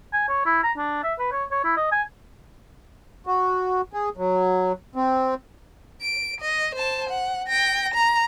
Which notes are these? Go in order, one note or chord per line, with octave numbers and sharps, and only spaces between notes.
G#5
C#5
E4
A#5
D4
E5
B4
C#5
C#5
E4
D#5
G#5
F#4
G#4
F#3
C4
D7
D#5
C5 A5
F#5
G5 A#6
A#5